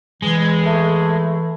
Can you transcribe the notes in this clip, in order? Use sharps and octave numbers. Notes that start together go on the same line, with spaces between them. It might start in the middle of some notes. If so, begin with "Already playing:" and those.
E3 G#3
A3